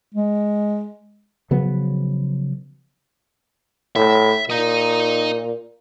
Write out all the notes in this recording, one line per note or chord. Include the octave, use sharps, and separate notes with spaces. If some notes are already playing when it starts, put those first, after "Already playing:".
G#3
C#3 F3 F#3 B3
A2 E5
A#2 D#5 A#5